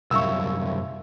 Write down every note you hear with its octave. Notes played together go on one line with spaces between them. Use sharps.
C2 F#2 E5 F5 C#6 E6